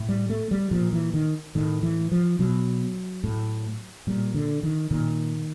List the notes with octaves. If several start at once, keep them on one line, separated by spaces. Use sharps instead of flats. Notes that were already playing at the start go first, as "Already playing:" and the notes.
Already playing: A2
G3
A3
G3
A#2 F3
E3
D#3
A2 D#3
E3
F3
B2 F#3
A2
A#2 G3
D3
D#3
A#2 D#3